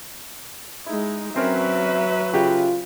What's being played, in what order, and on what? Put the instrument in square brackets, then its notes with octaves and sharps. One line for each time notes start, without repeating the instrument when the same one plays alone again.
[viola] G#3 D#4 [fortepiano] E4
[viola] F#3 B4 [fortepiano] C4 C#4 A#4 [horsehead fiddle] E5
[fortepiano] C#3 G4 [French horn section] F4